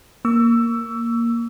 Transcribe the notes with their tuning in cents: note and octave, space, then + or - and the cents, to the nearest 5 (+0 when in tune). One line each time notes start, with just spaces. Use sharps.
A#3 +0 C#6 +40 E6 +10